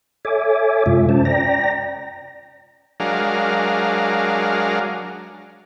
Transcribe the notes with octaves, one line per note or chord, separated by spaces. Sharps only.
A4 C#5 E5 G#5 D6
F#2 C3 G#3 F4 E5
C#4 C5 A5
D5 G5 A#5 A#6
F#3 G#3 D4 A#4 F5